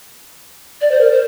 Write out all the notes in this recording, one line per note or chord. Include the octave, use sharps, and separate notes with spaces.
D5
C5
A#4
C5